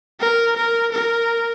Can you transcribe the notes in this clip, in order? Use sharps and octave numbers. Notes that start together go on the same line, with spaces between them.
A#4
A#4
A#4